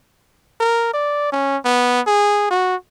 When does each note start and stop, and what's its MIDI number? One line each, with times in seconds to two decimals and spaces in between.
0.60 0.91 70
0.94 1.30 74
1.32 1.57 61
1.65 2.01 59
2.07 2.47 68
2.51 2.76 66